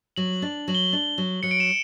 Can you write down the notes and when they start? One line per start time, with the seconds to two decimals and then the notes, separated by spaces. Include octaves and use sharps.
0.16 F#3 F#7
0.42 D4
0.68 F#3 F#7
0.75 G7
0.93 D4
1.18 F#3
1.43 F#3 C#7
1.51 D7
1.60 E7